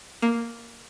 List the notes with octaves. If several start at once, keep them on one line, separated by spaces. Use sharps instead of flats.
A#3